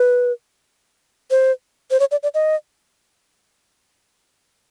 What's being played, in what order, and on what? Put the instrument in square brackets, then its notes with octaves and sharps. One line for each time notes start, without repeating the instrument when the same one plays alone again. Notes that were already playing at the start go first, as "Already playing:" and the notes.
Already playing: [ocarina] B4
C5
C5
C#5
D5
D5
D#5